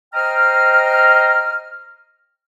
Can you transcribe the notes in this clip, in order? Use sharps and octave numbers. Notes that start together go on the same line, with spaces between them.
C5 D#5 G5 A#5 F6